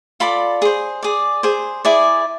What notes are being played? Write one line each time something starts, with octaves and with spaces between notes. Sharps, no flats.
F4 A4 D5 B5
G#4 C5
G#4 D5
G#4 C5
E4 G#4 D5